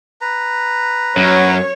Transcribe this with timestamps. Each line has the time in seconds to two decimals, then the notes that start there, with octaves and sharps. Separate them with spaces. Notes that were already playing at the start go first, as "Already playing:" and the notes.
0.21 B4 A#5
1.17 F#2 C#5